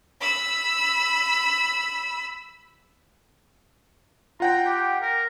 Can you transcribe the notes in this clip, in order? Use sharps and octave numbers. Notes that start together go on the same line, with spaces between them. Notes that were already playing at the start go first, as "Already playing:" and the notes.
B5 E6
F4 F#5 G5 A#5
G4
A#4